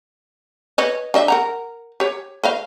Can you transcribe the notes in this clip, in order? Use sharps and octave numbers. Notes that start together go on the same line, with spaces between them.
B4 C#5 D#5
D4 D#5 E5
A#4 F#5 A#5
G4 C#5
B4 D#5 F5